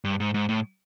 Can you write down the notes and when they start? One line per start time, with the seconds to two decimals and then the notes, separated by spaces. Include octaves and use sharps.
0.05 G2
0.20 G#2
0.34 G#2
0.49 A2